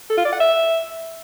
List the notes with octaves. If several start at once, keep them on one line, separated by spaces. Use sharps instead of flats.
A4
F4
D5
F#5
E5